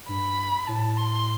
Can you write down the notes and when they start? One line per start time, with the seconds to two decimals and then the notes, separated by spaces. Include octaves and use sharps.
0.09 G2 B5
0.67 A2 A5
0.97 C6